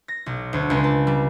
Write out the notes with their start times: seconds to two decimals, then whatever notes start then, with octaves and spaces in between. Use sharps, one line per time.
0.08 A#6
0.26 B1
0.53 D2
0.70 C#2
0.84 A5
1.07 G3